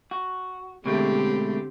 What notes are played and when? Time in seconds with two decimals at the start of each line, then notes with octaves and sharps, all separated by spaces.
0.11 F#4
0.86 B2 D3 G#3 A3 C4 G4